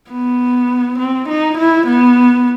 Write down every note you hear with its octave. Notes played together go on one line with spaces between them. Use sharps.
B3
C4
D#4
E4
B3